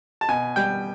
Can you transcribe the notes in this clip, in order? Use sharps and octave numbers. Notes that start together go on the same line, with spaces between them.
A5
B2 G#5
G3 G5